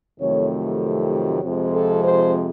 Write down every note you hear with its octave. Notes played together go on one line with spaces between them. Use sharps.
F2 C3 D#3 F#3 A3 C#5
G4
F2 C3 F3 G#3
A4
C5